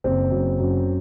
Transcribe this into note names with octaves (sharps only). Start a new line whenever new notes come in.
F#1 C4
F#2
F#2